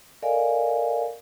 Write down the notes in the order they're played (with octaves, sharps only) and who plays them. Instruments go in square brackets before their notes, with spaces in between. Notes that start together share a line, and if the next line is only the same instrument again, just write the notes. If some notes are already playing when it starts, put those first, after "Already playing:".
[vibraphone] A4 A#4 D5 D#5 F5 G#5